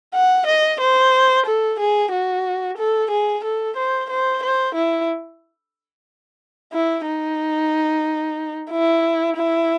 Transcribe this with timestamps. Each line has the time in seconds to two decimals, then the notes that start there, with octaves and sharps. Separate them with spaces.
0.14 F#5
0.46 D#5
0.80 C5
1.46 A4
1.79 G#4
2.12 F#4
2.77 A4
3.10 G#4
3.44 A4
3.76 C5
4.10 C5
4.43 C5
4.75 E4
6.73 E4
7.06 D#4
8.70 E4
9.36 E4